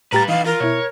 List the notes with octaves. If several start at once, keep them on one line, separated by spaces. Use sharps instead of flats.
A2 G3 G4 B4 A#5 A6
E3 D#4 B4 F5
F4 A#4
B2 E4 C#5